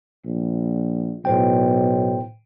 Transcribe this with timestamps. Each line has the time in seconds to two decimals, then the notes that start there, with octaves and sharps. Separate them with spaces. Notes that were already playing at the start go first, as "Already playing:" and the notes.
0.25 A#1
1.25 B1 A2 C5 G5